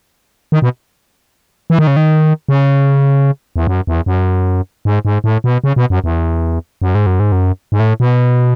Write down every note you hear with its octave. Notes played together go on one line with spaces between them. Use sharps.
D#3
B2
E3
D#3
C#3
D#3
C#3
E2
F#2
E2
F#2
G#2
G#2
A2
B2
C#3
B2
F#2
E2
F#2
G#2
F#2
G#2
F#2
G#2
A2
B2